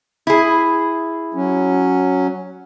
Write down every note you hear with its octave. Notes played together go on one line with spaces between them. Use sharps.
E4 G#4
F#3 C#4